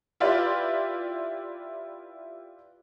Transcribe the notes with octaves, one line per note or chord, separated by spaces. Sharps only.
E4 F4 G4 B4 D5